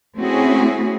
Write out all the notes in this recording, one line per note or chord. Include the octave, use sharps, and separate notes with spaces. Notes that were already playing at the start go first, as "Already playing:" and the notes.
A3 C4 C#4 E4 F#4 G#4